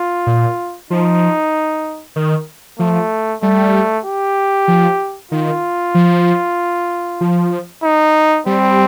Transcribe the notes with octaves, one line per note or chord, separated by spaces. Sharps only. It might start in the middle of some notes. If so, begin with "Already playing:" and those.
Already playing: F4
A#2
F3 D#4
D#3
F3 A3
G3 A3
G4
F3
D#3 F4
F3
F3
D#4
G3 C4